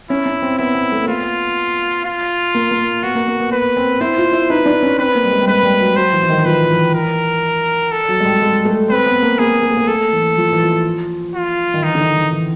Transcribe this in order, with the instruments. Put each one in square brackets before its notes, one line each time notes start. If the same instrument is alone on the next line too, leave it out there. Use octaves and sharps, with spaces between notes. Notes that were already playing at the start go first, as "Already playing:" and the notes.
[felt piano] C#4 [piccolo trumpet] E4
[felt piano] C#4
C4
[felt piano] B3 [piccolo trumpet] E4
[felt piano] B3
A3
A#3
[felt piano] B3 [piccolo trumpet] F4
[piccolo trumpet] F4
[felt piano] A#3
A#3
[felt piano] B3 [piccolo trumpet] F#4
[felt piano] A#3
A#3
B3
[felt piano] B3 [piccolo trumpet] B4
[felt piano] C4
[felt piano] E4 [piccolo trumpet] C5
[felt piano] F4
E4
[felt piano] D#4 [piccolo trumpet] B4
[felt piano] D4
C#4
[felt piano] C4 [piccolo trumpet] B4
[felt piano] A#3
G3
G#3
G3
[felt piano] G#3 [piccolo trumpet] B4
[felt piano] G3
F#3
[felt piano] F#3 [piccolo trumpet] C5
[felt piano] E3
E3
D#3
[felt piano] F3 [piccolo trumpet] B4
[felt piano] E3
[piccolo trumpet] A#4
A4
[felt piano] F#3
G#3
G3
G#3
A3
[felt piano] C4 [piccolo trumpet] B4
[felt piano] B3
A#3
[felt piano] A#3 [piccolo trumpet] G#4
[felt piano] A#3
A3
A#3
[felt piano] A3 [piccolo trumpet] A4
[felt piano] E3
F3
E3
F3
[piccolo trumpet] F4
[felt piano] D#3
[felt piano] E3 [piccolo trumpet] D#4
[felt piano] D3
D#3
E3
E3